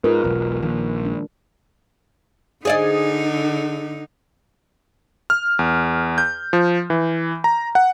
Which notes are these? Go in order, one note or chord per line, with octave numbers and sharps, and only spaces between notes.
G#2 F4 A#4 B4
E1 B1
A#1 D#3
G#3 D4
D3 D#4 G#4 D5 D#5
F6
E2
G6
F3
E3
A#5
F#5